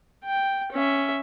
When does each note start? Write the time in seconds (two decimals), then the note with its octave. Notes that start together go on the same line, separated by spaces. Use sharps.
0.25 G5
0.72 C#4 E5